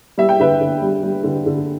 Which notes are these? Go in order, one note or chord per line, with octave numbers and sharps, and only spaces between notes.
G3 E5
G5
D3 B4 E5
D3
G3
G3
D3
D3